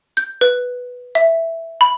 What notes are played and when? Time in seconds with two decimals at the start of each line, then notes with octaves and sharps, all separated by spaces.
0.17 G6
0.41 B4
1.15 E5
1.81 B5